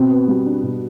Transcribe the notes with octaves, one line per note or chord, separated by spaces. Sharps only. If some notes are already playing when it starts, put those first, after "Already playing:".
Already playing: B2 C4
B3
G3
D4
B2